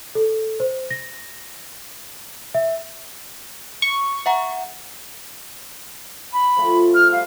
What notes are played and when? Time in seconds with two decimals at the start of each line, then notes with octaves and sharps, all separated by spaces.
0.15 A4
0.60 C5
0.91 A#6
2.55 E5
3.82 C#6
4.26 E5 F#5 A#5
6.33 B5
6.56 F3 A3 F#4
6.95 F6
7.12 G3 F5